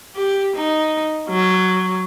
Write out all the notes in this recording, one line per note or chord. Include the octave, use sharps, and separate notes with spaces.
G4
D#4
F#3